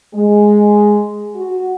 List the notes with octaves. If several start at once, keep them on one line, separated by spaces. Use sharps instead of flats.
G#3
F#4